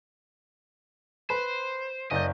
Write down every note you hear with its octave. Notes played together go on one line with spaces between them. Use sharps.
B4 C5
F#1 D5 D#5 G6